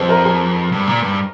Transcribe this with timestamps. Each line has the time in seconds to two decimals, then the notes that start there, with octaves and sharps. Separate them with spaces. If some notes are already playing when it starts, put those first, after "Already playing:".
Already playing: F2 G#4 C5
0.09 A#4
0.25 G#4
0.72 G2
0.87 A#2
1.02 G2